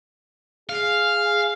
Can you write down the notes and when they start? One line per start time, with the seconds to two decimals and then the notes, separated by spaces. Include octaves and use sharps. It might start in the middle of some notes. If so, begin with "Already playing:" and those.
0.69 G#4 F5